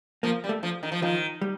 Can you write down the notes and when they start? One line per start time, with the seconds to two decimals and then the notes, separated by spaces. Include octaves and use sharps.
0.23 F3 A#3
0.44 G3
0.49 A3
0.63 F3
0.83 D#3
0.92 F3
1.02 D#3 F3
1.42 G3